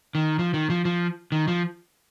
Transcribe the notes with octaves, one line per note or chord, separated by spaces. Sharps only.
D#3
F3
D#3
F3
F3
D#3
F3